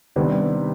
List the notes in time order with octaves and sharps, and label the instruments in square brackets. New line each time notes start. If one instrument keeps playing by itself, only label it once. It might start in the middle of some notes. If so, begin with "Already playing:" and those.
[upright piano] C3 D#3 G3 B3 D4